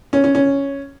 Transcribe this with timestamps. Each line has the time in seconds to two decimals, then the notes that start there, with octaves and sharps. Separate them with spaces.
0.13 C#4
0.24 C#4
0.35 C#4